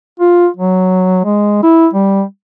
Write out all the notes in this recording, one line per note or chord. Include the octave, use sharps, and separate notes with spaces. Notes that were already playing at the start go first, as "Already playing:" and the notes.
F4
F#3
G#3
E4
G3